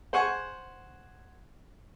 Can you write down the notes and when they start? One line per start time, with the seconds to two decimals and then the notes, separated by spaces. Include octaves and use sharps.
0.13 C5 F#5 G#5 C#6